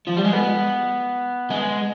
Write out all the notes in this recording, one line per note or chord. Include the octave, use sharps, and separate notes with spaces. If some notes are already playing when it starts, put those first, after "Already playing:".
F3
G3
G#3
B3
G#3